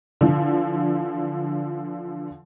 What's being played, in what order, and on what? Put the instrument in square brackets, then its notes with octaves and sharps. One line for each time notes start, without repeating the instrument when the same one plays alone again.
[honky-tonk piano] D3 E3 F3